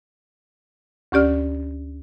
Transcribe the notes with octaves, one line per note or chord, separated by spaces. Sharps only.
D2 C#4 G4 D5 F6